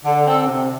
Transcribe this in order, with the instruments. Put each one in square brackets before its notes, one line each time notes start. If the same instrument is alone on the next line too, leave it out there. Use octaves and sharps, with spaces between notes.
[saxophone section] D3
C4 A4
C3